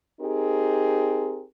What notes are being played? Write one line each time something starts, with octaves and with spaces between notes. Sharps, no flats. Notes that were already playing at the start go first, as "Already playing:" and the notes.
C4 D#4 G4 G#4 A#4